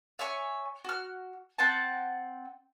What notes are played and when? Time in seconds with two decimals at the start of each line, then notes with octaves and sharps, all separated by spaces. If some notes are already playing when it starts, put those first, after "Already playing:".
0.19 C#5 E5 G#5 C#6
0.85 F#4 F6
1.59 C4 F#5 G5 A5